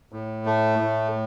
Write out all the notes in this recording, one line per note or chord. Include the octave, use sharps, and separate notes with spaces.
A2
A3
A2